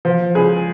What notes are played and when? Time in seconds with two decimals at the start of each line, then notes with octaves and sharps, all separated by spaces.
0.05 F3
0.35 C#2 G#4